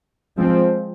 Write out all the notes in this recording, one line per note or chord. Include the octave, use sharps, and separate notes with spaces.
F3 G#3 C4